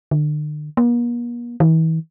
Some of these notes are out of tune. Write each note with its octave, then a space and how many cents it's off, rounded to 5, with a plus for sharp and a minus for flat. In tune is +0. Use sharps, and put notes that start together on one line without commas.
D3 +40
A#3 +45
E3 -40